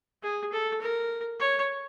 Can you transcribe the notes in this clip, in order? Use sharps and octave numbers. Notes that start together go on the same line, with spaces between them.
G#4
A4
A#4
C#5